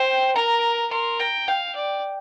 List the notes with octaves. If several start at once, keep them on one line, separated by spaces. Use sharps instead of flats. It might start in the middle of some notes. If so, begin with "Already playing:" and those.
Already playing: C5 G5
A#4 A#5
A#4 C6
G5 A#5
F5 G5
D5